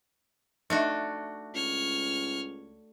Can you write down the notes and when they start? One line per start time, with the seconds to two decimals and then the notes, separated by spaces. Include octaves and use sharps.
0.70 A3 D4 D#4 F#4 D#5 E5
1.54 C#2 C#5 F6